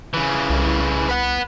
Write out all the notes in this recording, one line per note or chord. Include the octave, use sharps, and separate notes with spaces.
C#3 E3
C2
B4 F#5